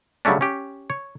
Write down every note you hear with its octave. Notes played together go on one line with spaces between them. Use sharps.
C#3 F#3 G3 A3 C#4 D4
C#4 G4
C#5